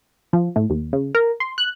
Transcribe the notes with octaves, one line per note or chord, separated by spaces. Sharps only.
F3
A2
D#2
C#3
A#4
C6
F#6